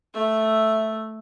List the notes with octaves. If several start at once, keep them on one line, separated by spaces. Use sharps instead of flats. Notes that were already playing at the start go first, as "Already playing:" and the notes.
A3 E5